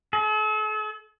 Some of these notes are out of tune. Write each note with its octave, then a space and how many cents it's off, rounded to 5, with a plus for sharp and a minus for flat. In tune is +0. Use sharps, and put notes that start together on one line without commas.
A4 -45